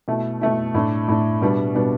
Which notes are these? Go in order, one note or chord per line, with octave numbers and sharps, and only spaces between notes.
B2 A3 E4
B2 A3 E4
A2 A3 D4
A2 A3 D4
B2 G3 B3 D4
B2 G3 B3 D4